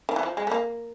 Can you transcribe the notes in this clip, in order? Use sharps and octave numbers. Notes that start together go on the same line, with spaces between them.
D#3
E3
F3
G#3
A3
A#3